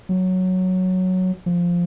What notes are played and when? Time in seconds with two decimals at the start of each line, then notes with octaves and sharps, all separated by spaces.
0.09 F#3
1.46 F3